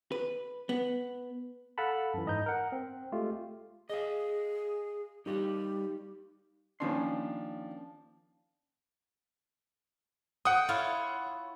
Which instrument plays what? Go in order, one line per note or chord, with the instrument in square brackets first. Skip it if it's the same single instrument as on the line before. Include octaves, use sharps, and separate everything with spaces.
[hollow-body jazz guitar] B4
B3
[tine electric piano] A4 F5 F#5 A5 B5
F#2 E3
G#2 D#5 A#5 G6
A#4 F#5
C4
G#3 A3 F4 G4
[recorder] G#4 [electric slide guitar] D#5 F5
[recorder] G3 [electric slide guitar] D#4 G4 F5
[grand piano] D#3 F3 D4 [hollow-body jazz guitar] A#3 C#4 C6
[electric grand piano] F#5 D#6 [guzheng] G5
[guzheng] E4 F4 C#5